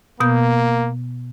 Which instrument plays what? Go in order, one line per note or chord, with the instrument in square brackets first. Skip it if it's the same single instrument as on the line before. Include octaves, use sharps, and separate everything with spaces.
[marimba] B2 B3 G6 [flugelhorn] A#3